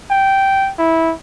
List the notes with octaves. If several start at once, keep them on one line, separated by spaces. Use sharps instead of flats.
G5
E4